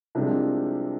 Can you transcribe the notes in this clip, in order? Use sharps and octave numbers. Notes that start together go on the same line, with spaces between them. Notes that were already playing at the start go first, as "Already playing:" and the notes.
C2 C3 F3 G#3 D4